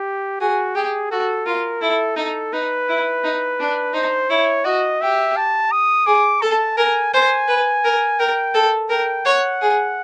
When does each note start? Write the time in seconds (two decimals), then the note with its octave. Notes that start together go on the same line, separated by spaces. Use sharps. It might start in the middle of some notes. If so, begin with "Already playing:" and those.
Already playing: G4
0.41 F#4 G#4
0.76 G4 G#4
1.11 F#4 A4
1.46 F4 A#4
1.81 E4 A4
2.17 D#4 A4
2.53 D#4 B4
2.89 E4
3.24 D#4
3.59 D4
3.94 D#4 C5
4.30 E4 C#5
4.65 F#4 D#5
5.01 G4 E5
5.37 A5
5.72 D#6
6.06 G#4 D6
6.42 A4 A5
6.77 A#4 G#5
7.13 C5 G#5
7.48 B4
7.84 A#4
8.19 A#4 G5
8.54 A4
8.90 A#4 G5
9.25 C#5 F#5
9.61 G#4